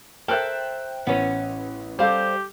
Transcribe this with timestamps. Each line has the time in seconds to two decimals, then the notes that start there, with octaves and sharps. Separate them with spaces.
0.28 A4 A#4 C5 E5 G5 F#6
1.07 A1 B3 C#4 B4
1.99 G3 G4 A4 C5 F5